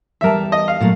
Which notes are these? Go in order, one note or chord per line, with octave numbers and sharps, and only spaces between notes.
E2 G3 A#4 E5 A5
D#5
F5
A#2 F#3 A3